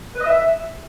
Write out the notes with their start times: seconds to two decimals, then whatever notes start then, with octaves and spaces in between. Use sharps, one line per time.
0.14 B4
0.20 D#5
0.26 E5